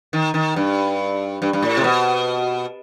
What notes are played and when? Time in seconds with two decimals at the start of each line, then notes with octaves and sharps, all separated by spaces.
0.13 D#3
0.34 D#3
0.56 G2
1.42 G2
1.53 G2
1.63 A2
1.77 C3
1.84 B2